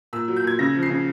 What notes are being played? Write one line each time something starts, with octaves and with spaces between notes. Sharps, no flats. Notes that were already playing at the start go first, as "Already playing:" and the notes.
A#2 E6
F#3
G6
A#2 G#6
C#3 A#6
F3
C7
C#3